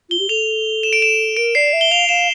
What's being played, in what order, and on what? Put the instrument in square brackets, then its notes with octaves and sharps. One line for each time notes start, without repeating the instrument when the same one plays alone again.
[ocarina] F4 [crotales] G7
[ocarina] G4
[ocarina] A4 [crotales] F7
[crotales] E7
D7
E7
[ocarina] A#4 [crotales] D7
[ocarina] D5 [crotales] C7
[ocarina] E5
[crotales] G7
[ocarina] F5 [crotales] F7
[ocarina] F5 [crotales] E7